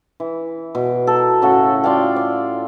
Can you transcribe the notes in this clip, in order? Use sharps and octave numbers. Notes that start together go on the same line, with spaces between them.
E3
B2
A4 A#4
A2 C#3 F#4 A4
F4 D5 F5 G5
D5